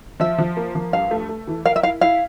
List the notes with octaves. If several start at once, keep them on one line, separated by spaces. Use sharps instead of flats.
F3 E5
F3
A#3
F3
G2 F5
A3
A3
E3
A#4 F5
E5
E4 F5
E4 F5